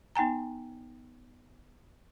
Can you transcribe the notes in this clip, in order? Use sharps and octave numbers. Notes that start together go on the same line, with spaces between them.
B3 D#4 G5 G#5 A#5